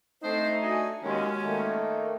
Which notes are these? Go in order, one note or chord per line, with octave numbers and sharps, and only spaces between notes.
A3 C4 D4 D#4 C5
D4 F#4 G#5
D#2 F#3 G#3 C#4
D#3 A3 A#3